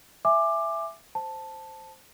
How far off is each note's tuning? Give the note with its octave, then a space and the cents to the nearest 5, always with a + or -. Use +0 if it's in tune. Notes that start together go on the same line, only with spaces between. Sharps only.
E5 +10 G#5 +0 D6 +15
C5 +0 A5 +0